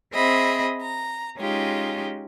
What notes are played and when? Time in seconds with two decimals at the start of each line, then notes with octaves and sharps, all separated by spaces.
0.13 C4 G#4 D#5 E5 B5
0.82 A#5
1.38 G#3 C#4 D#4 F4 G4